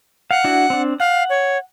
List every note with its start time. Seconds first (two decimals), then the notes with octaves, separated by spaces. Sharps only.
0.31 F5 F#5
0.44 D4 E4 F#4
0.70 C4 D4
1.00 F5 F#5
1.30 C#5